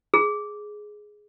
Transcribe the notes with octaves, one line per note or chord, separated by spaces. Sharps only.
G#4